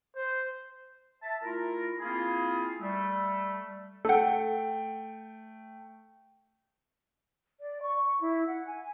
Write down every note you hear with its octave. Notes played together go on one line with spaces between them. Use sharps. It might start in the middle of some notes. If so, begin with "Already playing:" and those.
C5
E5 A5
A3 E4 F4 A#4
A#3 C4 E4 F4 G#4
G3 A3
A3 A4 F#5 G5
D5
C#6
E4
F#5
G#5